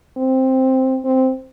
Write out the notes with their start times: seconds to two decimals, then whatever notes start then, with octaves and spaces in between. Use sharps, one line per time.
0.17 C4
1.05 C4